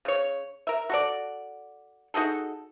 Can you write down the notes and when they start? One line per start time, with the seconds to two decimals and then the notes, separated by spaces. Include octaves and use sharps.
0.05 C#3 C#5
0.67 A#4 E5
0.89 F#4 A4 D5
2.14 D#4 F#4 G#4 A4